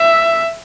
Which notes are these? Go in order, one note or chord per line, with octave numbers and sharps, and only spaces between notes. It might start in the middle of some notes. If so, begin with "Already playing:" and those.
Already playing: E5